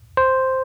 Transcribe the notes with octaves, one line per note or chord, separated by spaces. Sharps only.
C5